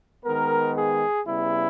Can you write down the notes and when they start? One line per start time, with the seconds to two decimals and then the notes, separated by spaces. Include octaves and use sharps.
0.25 D#3 G#3 B3 A#4
0.75 G#4
1.25 C#3 G3 B3 E4